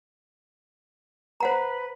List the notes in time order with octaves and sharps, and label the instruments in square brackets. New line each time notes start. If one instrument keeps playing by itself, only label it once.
[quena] B4 [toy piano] C5 F#5 A#5